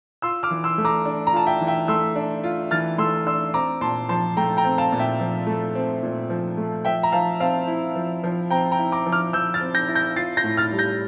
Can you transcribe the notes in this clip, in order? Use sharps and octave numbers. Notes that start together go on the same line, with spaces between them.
F4 C6 E6
D6 F6
E3
C6 E6
A3
A#5 D6
D4
A#5
F4 A5
E5 G5
E3
E5 G5
A3 C6 E6
D4
F4
E3 F6 A6
A3 C6 E6
D4 C6 E6
C4 A#5 D6
A#2 A5 C6
F3 A5 C6
A3 G5 A#5
G5 A#5
C4
F5 A5
A#2
E5 G5
F3
A3
C4
A#2
F3
A3
F3 E5 G5
A#5
F3 F5 A5
C4 F5 A5
E4
F3
F3
C4 G5 A#5
G5 A#5
E4
A#5 D6
F3
D6 F6
F3 E6 G6
F6 A6
C4
G6 A#6
E4
G6 A#6
F4 A6 C7
G6 A#6
A2
F6 A6
G3
G6 A#6